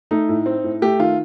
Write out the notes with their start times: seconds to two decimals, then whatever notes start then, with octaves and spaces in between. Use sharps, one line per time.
0.11 A3 D#4
0.29 A2
0.46 C4
0.64 A2
0.82 A3 G4
1.00 D#3 F4